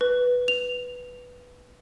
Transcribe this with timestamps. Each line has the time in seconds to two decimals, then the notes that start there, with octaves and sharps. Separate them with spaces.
0.01 B4
0.48 F7